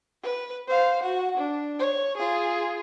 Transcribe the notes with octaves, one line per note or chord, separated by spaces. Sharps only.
B4
C5 F5
F#4 F#5
D4
C#5
F4 G#4